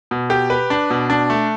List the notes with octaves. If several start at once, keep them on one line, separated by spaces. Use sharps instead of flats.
B2
G4
B4
D4
B2
D4
A3